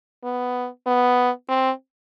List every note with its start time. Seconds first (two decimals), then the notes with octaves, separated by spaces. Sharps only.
0.24 B3
0.87 B3
1.49 C4